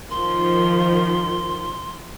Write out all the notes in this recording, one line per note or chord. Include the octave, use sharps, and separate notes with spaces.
D#3 F3 C6